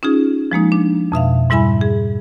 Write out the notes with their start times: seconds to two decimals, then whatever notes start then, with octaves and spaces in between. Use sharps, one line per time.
0.03 C#4 D#4 F4 G#4
0.52 F3 G#3 A#3 D#4
0.72 D4
1.12 F2 B2 E5 F5
1.50 G#2 G3 E4 E5 G#5 B5
1.81 G#4